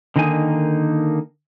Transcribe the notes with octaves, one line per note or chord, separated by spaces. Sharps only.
D3 D#3 A#3 D#4 G#5